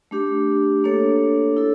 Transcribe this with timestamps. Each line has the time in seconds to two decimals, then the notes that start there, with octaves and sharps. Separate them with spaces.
0.11 A3 D4 G4
0.84 A#3 D4 A4 C#5
1.57 E4 A4